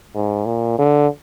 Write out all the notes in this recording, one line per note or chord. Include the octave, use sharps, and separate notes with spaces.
G#2
A#2
D3